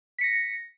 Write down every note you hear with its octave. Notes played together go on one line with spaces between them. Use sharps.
A#6 B6 C#7